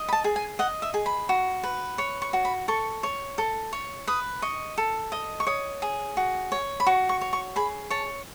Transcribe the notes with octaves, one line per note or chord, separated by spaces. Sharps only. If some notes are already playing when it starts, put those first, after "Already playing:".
Already playing: D#5
B5
A5
G#4
G#5
D#5 F#5
E5
G#4
B5
F#4
B4
C#5 C#6
C#6
F#4
B5
A4 C#6
C#5
A4
C#5
B4 D#6
D#5 C#6
A4
D#5
C#6
C#5 D#6
G#4
F#4
C#5
B5
F#4 C#6
C#6
C#5
C#6
G#4 B5
C#5 A5